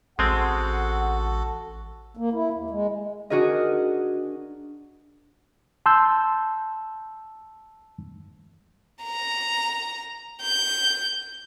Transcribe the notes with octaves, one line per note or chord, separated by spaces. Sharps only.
A1 G#3 C4 F#4 A4 F#5
A#3
E4
D#2
G#3
D4 F#4 G#4 A#4 D#5
A5 C6 E6 G6
A#5
G6